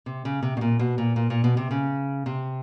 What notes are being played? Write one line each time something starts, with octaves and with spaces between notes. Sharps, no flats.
C3
C#3
C3
B2
A#2
B2
A#2
A#2
A#2
B2
C3
C#3
C3